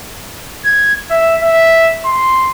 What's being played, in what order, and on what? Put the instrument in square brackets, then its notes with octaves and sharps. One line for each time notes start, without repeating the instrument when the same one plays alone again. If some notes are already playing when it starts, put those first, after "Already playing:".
[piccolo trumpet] G#6
E5
E5
C6